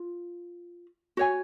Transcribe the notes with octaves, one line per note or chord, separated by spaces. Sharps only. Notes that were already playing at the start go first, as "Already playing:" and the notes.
Already playing: F4
F#4 C#5 G#5